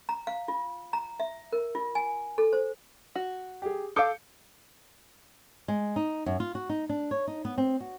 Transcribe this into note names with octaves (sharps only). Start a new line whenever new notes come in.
A#5
F5
F4
A#5
E5
A#4
F4
G#5
A4
C5
F#4
G4 G#4
A4 F5 D6 G6 C#7
G#3
D#4
F#2
F4
F#4
D#4
D4
C#5
D#4
B3
C4
F#4